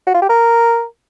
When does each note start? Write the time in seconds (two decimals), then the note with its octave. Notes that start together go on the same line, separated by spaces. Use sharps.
0.07 F#4
0.14 F4
0.22 G4
0.29 A#4